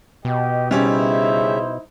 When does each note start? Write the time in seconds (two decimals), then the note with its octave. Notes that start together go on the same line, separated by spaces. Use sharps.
0.25 B2 G4 D#5
0.71 C#3 G3 C#4 D#4 E4 C5 E5